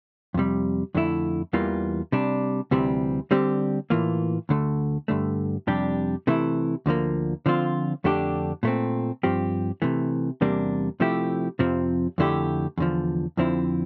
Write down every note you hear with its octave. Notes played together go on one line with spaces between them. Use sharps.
F2 C3 G3
F2 D3 A3 E4
E2 E3 G3 A#3 F4
C3 G3 D4
D2 C3 E3 G3 C4
D3 G3 C4 G4
A2 E3 A#3 F4
D2 D3 A3
G2 D3 A3
F2 C3 G3 D4 G4
C3 E3 A3 E4
D2 D3 F3 A#3
D3 F3 C4 F4
F2 D3 A3 D4 G4
A#2 A3 C4
G2 F3 C4 G4
C3 E3 A3
E2 C3 G3 A#3 D4
C3 F3 A3 E4 G4
F2 C3 F3 C4
F2 D3 A3 E4 G4
E2 D3 F3
F2 D3 F3 C4 E4